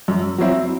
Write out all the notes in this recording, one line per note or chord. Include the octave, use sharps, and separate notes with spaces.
F#2
F#3 C4 E4